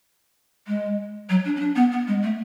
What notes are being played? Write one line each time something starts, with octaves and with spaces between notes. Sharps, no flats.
G#3
F#3
D4
C#4
D4
B3
B3
G#3
A3